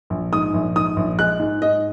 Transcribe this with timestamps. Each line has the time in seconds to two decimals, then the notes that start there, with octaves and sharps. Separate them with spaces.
0.10 A#1
0.33 G#2 D#6
0.54 A#1
0.76 G#2 D#6
0.97 A#1
1.19 G#3 F#6
1.40 G#2
1.62 G#2 D#5